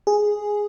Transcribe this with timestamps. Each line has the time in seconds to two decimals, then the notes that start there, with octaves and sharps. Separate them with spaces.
0.07 G#4